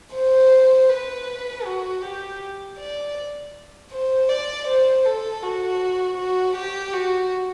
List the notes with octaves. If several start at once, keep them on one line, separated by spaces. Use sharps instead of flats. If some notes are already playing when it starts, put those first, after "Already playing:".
C5
B4
F#4
G4
D5
C5
D5
C5
A4
F#4
F#4
G4
F#4